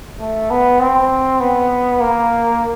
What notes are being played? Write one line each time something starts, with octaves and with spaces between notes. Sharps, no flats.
A3
B3
C4
B3
A#3